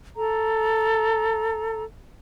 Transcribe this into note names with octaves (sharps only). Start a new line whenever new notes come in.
A4 A#5